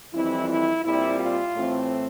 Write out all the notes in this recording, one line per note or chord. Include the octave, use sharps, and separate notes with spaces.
F2 E3 G3 C4 E4
E4
A#2 G3 C4 E4
F4
A2 E3 A3 C4